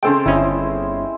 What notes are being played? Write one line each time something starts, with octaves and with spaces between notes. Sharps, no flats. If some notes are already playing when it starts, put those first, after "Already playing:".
C#3 G#3 C4 A4 C5 G5
G1 C#4 E4 C5 D#5